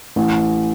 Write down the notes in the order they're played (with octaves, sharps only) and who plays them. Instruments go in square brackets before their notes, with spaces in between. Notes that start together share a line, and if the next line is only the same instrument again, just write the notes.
[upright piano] A1